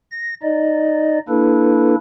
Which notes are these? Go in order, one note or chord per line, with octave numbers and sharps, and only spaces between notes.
A#6
D#4 D5 D#5
A#3 D4 E4 A4 B4